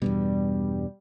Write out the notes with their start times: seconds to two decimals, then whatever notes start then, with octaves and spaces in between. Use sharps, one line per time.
0.02 E2 G2 B2 G3